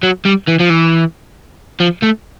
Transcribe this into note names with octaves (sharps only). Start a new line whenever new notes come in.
F#3
G3
E3
F3
E3
F3
A3